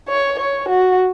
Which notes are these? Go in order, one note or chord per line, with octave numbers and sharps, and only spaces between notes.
C#5
C#5
F#4